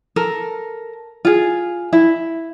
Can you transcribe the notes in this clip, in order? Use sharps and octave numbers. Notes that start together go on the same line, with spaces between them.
A4 A#4
F4 G#4
E4